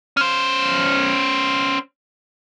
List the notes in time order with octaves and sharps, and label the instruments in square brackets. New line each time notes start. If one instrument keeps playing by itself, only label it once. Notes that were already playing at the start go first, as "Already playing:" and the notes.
[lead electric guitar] C#4 C5